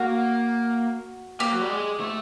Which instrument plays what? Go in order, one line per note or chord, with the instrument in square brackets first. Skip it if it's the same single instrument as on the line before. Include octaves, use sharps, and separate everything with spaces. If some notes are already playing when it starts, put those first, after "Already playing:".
Already playing: [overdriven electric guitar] A#3 [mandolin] F#4
[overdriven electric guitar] A#3 [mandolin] G4
[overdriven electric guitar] F#3
G3
G#3
A3